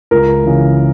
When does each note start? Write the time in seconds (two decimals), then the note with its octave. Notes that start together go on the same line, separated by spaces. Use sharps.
0.11 C#2 A#4
0.43 C#3 E3